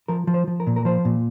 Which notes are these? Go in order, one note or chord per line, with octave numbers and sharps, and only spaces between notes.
F3 A#4
F3
C5
F3
A#4
A#2
A#4
F3 C5
A#2